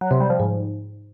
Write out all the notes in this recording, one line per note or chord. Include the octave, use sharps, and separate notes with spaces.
F#3
C3
G3
F3
G#2